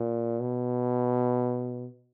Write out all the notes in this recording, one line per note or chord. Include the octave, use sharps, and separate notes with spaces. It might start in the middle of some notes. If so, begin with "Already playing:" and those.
Already playing: A#2
B2